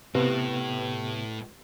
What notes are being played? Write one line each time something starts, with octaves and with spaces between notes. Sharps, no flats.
A2 C3 B3 G4 B4